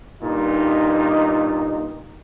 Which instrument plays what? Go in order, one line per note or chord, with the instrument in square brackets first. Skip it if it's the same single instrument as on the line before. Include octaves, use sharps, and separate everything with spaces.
[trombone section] G2 A#2 D#4